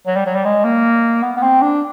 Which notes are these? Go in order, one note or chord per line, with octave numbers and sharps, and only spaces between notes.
F#3
G3
F#3
G3
G#3
A#3
B3
B3
C4
D4